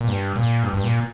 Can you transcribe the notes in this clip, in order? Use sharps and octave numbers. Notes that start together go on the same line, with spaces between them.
A#2
G2
A#2
G2
G2
A#2